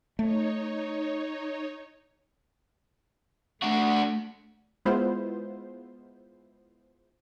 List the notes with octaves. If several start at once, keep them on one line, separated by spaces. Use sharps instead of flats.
A3 D#4 C#5
A3 D4 F#4
G#3 B3 E4 F4 C5